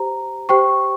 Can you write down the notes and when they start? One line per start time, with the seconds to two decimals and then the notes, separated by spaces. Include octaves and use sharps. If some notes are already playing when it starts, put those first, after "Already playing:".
Already playing: G4 C5 A#5
0.49 G4 C5 G5 C#6